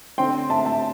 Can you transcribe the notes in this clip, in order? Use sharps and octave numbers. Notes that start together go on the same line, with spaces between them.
D3 C4 G5 C6
E5 A5
E5 A5